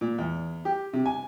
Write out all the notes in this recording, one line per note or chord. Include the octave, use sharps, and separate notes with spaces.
A#2
E2
G4
C3
G#5